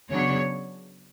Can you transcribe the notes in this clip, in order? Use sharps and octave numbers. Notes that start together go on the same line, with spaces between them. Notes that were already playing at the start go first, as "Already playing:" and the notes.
C#3 F#3 B3 D4 C#5